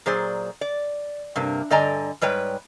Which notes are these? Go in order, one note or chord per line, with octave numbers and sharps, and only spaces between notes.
A#2 F#3 G#4 C5 D5
D5
G2 C3 A#3
G2 D3 D5 D#5 G#5 A#5
G#2 G3 B4 C#5 G5